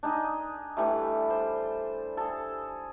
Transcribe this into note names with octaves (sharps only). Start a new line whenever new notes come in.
D4 D#4 G#4 D#5
E3 G3 A3
C5
G#4 A4